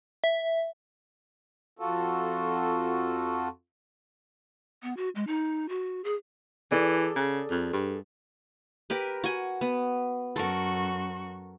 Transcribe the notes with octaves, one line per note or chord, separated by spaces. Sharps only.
E5
F2 F4 F#4 A4
B3
F#4
G#3
D#4
F#4
G#4
E3 G#4 A4 D5
C#3
F2
G2
G4 A#4 B4
F#4 G#5
B3
F#2 F#4 A4 A#4 C#6